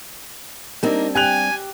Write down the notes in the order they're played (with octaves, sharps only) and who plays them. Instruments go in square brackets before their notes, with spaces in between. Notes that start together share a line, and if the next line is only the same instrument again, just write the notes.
[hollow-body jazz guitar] G3 C4 D4 [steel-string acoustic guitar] A#3 D#4
[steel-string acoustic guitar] G4 [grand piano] G5 F#6 F7 [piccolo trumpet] G#5